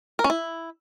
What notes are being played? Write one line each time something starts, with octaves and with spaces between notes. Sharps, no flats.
A#4
C#4
E4